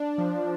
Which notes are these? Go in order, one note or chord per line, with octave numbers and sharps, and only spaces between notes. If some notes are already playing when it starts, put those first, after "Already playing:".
Already playing: D4
F3